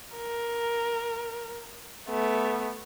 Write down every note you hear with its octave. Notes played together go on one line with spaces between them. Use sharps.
A#4
A3 B3